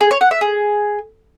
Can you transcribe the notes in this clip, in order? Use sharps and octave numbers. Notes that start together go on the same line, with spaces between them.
G#4
C#5
F#5
E5
G#4